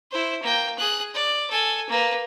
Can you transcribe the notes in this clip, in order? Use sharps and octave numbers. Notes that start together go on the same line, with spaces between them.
E4 C5
A#3 G5
G#4 F#6
D5
A4 G#5
A#3 B4